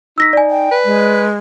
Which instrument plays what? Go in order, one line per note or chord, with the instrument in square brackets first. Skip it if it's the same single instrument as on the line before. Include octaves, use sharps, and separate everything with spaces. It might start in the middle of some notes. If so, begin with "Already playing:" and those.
[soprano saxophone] D#4 [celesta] E6 A#6 B6
[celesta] D5 G#5
[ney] G5
[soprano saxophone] B4
[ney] G#3